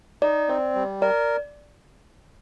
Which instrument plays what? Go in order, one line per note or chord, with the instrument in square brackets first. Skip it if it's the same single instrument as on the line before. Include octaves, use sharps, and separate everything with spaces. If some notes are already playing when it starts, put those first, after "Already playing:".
[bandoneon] D#4 [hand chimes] D5
[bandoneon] C4 [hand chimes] D5
[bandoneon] G3
[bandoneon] A#4 [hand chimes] D5